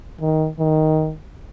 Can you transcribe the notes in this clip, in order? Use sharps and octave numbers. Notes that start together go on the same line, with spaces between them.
D#3
D#3